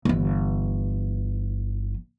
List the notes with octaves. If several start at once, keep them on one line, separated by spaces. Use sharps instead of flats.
G1 E3